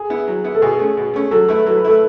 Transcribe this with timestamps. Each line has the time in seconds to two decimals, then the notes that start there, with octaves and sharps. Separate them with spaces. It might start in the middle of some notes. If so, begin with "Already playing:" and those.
Already playing: G#4
0.10 B3 E4
0.27 F#3
0.44 B3 E4
0.55 A4
0.62 B2 G#4
0.79 A3 C#4
0.97 B2
1.14 A3 C#4
1.31 F#3 A4
1.48 A3 E4 B4
1.66 F#3 A4
1.76 B4
1.85 A3 E4 A4